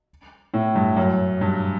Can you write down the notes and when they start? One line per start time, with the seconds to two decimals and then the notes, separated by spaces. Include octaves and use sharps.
0.54 A2
0.76 G2
0.97 F#2
1.41 G2